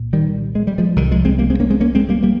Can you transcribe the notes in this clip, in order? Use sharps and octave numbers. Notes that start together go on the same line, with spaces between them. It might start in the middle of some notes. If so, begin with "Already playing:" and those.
Already playing: C2 A#2
D#3 G3
G#3
G3
F3 G#3
C2 C3 D#3 G3
F3 G#3
G#3 C4
G3 A#3
G#3 C4
A#3 C#4
G#3 C4
A#3 C#4
G#3 C4
G3 A#3
G3 A#3